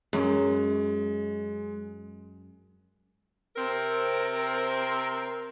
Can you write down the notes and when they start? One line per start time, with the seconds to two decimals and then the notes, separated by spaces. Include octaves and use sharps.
0.13 F#2 G#3
3.56 C3 C4 A#4